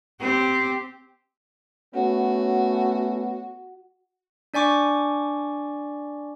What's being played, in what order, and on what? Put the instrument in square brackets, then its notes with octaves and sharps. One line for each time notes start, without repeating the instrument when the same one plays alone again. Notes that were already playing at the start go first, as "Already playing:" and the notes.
[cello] C4 G4
[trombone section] A3 B3 C#4 [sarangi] F#4
[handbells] D4 D5 G#5 C#6 D6